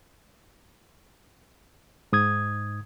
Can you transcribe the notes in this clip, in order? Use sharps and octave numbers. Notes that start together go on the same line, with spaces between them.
G#2 D#6 G#6